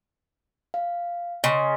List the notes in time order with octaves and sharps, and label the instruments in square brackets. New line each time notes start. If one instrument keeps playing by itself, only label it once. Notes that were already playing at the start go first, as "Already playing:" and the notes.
[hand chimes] F5
[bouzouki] C#3 [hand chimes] D#5 G#5 C6